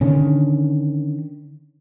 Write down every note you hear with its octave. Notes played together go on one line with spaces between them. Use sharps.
D3 D#3 C#4